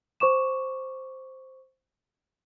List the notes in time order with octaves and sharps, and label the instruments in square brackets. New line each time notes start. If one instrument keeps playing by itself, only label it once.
[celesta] C5 C#6 D6 E7